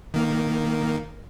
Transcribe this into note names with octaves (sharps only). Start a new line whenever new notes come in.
D#3 A#3